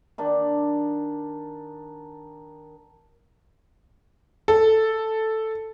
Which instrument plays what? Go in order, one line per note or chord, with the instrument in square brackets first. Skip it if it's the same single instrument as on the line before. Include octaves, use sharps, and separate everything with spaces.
[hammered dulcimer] D#3 D4 D5
[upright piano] A4